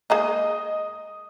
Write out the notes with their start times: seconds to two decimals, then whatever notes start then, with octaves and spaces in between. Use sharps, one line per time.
0.10 G#3 A#3 D#4 D#5 D#6